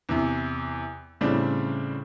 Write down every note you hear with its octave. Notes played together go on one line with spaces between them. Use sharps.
E2 C3
A2 C#3 G3 C4 D4